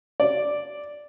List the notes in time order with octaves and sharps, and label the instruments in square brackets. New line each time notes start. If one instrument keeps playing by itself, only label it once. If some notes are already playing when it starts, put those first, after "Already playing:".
[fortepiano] D5